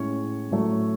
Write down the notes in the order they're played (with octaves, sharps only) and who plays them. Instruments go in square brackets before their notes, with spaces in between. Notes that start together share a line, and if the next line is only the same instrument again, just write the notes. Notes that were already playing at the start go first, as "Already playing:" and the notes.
Already playing: [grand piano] A2 G#3 C#4 C#5
A2 F#3 A3